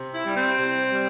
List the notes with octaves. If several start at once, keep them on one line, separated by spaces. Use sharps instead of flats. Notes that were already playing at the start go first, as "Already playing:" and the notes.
Already playing: C3
E4
G3
C4
C3
G3